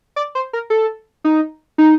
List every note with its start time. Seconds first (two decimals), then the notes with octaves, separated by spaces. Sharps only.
0.16 D5
0.35 C5
0.53 A#4
0.70 A4
1.24 D#4
1.78 D#4